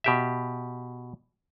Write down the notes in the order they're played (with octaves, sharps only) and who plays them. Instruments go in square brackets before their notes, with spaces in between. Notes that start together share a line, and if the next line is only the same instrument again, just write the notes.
[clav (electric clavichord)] B2 G4 E5